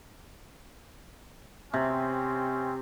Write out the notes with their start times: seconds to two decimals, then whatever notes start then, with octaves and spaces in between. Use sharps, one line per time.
1.74 C3 C4 C#4